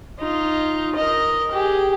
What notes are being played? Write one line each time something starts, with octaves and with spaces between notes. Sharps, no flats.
D#4 F4
A#4 D#5
G4 G#4